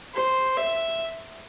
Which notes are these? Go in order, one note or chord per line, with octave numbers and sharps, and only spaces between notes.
C5
E5